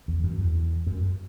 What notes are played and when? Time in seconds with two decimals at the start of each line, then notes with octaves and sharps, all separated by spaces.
0.08 E2
0.23 F#2
0.39 E2
0.87 F#2